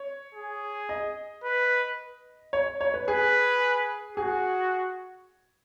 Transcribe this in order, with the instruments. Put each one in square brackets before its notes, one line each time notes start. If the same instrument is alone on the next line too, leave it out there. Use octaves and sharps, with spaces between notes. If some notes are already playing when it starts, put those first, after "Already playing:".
Already playing: [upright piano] C#5
[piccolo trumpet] G#4
[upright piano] D#5
[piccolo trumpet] B4
[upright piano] C#5
C#5
B4
[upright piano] G#4 [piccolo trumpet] B4
[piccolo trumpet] F#4 [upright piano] G#4